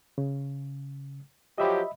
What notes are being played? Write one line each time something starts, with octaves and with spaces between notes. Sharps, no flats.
C#3
F3 F#3 G4 D#5 E5 B5